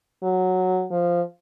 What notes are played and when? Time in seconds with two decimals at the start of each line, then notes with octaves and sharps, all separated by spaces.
0.23 F#3
0.91 F3